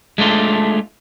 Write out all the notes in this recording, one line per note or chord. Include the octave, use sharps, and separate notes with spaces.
G#3 A3 D4 F4